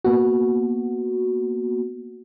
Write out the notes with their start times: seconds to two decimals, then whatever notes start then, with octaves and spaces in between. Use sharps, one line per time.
0.05 A#3 B3 F#4